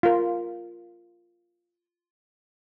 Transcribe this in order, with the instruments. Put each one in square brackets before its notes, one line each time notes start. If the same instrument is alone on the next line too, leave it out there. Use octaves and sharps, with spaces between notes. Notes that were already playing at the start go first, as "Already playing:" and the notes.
[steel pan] F4 A#4